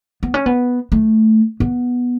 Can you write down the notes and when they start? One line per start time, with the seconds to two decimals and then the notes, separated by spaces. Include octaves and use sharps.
0.23 B3
0.34 C#4
0.46 B3
0.92 A3
1.60 B3